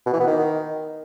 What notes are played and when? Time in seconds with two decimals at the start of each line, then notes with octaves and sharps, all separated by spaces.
0.06 B2
0.13 E3
0.20 B3
0.27 D#3